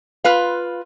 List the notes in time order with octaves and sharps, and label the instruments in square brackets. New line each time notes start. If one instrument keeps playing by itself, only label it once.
[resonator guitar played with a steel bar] F4 B4 F5